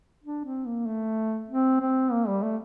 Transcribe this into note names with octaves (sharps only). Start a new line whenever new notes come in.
D4
C4
A#3
A3
C4
C4
A#3
G3
A3